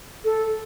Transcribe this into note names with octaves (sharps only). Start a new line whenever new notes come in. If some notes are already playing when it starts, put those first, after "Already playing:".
A4